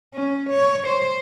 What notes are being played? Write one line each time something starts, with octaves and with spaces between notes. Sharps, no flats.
C#4
C#5
C5